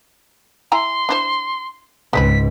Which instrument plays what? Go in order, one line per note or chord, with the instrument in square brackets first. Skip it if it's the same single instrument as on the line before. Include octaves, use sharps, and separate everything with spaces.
[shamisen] E4 G#5 A#5 [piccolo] C6
[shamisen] D4 E4 C5
[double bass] C#2 G#2 [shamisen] G#3 C4 B4 [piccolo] B6